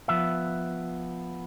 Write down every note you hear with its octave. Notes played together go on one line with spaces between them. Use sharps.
F3 B3 E5